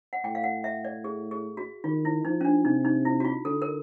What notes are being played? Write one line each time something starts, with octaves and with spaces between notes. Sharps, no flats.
F#5
A2 G5
F5
F#5
E5
D5
G#4
G#4
F#4
D#3 F4
E4
F3 D#4
C#4
D4
C3 D#4
D#4
E4
F#4
F4
D3 A4
A#4